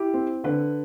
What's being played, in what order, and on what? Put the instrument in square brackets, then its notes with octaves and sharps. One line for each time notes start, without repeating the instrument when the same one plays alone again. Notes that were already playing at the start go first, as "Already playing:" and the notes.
Already playing: [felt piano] E4 G4
C4
D3 B4